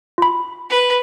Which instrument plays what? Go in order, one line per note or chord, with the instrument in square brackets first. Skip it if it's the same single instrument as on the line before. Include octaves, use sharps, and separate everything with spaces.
[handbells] F4 B5
[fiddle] B4